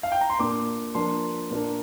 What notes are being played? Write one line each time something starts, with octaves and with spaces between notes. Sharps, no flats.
F5
G5
A#5
C6
A#2 A#3 D4 D6
F3 A#3 D4 C6
A#2 A#3 D4